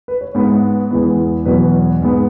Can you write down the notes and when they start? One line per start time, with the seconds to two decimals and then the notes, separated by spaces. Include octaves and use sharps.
0.08 B4
0.21 C#5
0.35 G#2 G#3 B3 B4
0.91 E2 E3 G#3 B3
1.45 E2 B2 F#3 B3 B4
2.01 G#2 G#3 B3